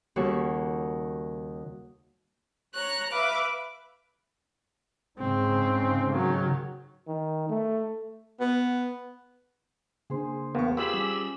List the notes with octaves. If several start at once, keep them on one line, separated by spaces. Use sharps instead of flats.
D#2 C#3 G3 F#4 A4 C#6
C#5 A#5 F#6
B4 E5 F5 D6
G#2 C#3 C4
D#3 F#3
D#3
A3
B3
C#3 A#3 D4 G#4 C5
E2 A#3 B3 G5 C#6
F4 G4 G#4 D5 B5 E6
G3 C#4 D6